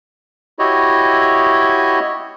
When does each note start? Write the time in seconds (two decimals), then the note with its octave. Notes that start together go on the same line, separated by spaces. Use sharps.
0.59 E4 F#4 G4 C#5 D#5